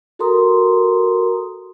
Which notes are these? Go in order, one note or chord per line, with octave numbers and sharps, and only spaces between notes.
F#4 A4 A#4 A#5 C6 D#6